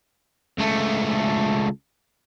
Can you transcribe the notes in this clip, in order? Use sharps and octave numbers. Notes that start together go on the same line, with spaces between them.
C#2 A3